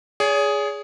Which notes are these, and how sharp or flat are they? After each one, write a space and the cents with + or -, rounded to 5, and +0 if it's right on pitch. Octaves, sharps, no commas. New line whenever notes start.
G#4 +0 C#5 +45